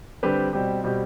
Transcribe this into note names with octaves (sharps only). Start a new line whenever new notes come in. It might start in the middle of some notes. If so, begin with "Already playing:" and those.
D3 G3 C4 G4 B4
B2 G3 C4 G4
B2 G3 C4 G4